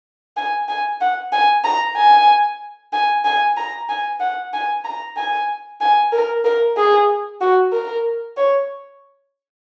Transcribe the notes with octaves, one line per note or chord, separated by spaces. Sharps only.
G#5
G#5
F#5
G#5
A#5
G#5
G#5
G#5
A#5
G#5
F#5
G#5
A#5
G#5
G#5
A#4
A#4
G#4
F#4
A#4
C#5